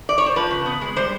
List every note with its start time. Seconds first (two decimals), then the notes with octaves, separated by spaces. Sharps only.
0.09 D5
0.18 C#5
0.26 C5
0.36 F3 B4
0.51 C#3
0.66 B3
0.81 G#3
0.96 G3 C5